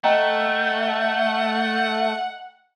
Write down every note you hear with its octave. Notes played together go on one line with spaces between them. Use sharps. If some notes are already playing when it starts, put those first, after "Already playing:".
A3 D#5 F#5 G5 A#5